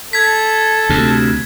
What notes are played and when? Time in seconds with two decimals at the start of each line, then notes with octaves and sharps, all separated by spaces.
0.13 A4 G#6 B6
0.89 D2 C3